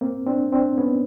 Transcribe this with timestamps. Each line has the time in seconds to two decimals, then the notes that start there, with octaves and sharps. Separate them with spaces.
0.01 A#3 C4
0.26 C4 D4
0.52 C4 D4
0.78 B3 C#4